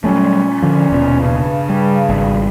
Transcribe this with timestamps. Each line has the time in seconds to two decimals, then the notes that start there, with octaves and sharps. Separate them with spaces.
0.04 A#2 F#3 G3 A3 C#4
0.63 D3 F3
0.90 D#1 B2
1.20 G2 C#3
1.69 G3
2.09 G#1 G3